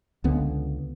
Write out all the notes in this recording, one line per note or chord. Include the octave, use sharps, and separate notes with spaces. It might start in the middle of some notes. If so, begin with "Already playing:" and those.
C#2 D3 B3